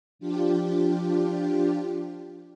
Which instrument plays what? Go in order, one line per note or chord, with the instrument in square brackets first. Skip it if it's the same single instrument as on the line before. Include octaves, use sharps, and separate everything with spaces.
[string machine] F3 D4 F4 G4